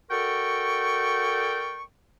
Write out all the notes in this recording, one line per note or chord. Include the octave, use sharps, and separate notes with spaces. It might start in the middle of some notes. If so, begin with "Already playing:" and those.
F#4 A4 A#4 D5 G5 C#6